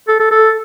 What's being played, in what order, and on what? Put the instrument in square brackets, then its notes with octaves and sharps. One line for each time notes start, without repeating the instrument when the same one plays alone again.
[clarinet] A4
A4
A4